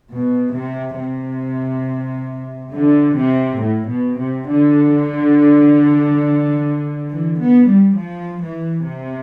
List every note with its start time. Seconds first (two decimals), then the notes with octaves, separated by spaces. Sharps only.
0.11 B2
0.55 C3
0.98 C3
2.73 D3
3.16 C3
3.61 A2
3.89 B2
4.19 C3
4.48 D3
7.09 E3
7.39 B3
7.68 G3
7.97 F3
8.41 E3
8.84 C3